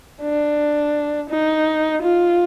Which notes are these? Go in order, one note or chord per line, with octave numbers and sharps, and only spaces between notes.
D4
D#4
F4